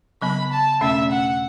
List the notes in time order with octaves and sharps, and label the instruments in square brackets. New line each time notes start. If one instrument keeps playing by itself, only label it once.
[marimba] C#3 F#3 B3 [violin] B5
[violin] A5
[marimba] E2 B2 A3 C#4 [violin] E5
[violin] F#5